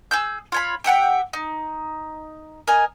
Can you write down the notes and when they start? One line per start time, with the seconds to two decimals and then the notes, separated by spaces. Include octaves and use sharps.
0.11 G#4 E6 G6
0.52 F4 C#5 B5
0.84 G4 E5 F#5 G5
1.33 D#4
2.67 A#4 D#5 G#5